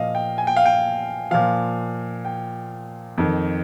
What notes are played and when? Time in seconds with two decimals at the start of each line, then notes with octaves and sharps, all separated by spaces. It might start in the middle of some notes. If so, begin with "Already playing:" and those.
Already playing: A#2 F3 D#5 F5
0.15 G5
0.38 G#5
0.47 G5
0.57 F5
0.66 G5
1.31 A#2 F3 F5
2.25 G5
3.18 F2 D#3